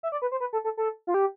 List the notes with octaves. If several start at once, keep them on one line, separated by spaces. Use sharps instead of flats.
E5
D5
B4
C5
B4
A4
A4
A4
F4
G4